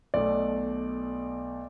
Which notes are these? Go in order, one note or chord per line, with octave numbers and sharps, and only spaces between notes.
B1 B2 A3 D5